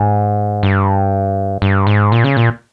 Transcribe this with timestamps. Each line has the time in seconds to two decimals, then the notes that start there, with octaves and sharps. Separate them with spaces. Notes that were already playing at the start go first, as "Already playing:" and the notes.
Already playing: G#2
0.63 G2
1.62 G2
1.87 G#2
2.12 A#2
2.24 C#3
2.37 A#2